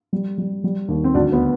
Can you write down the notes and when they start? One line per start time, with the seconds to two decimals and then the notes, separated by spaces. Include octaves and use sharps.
0.13 G3
0.38 G3
0.64 G3
0.88 D#2
1.04 C4
1.14 D2 D4
1.32 B3